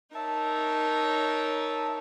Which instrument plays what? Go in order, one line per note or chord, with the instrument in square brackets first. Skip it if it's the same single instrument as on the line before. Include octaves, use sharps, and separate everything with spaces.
[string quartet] D#4 A#4 C#5 [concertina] E5 A5